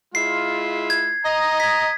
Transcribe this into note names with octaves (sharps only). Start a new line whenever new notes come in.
G#3 E4 F4 C7
G#6
D#5 A#5
G#6 B6